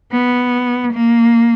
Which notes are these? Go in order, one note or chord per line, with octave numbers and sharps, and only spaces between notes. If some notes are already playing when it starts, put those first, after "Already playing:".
B3
A#3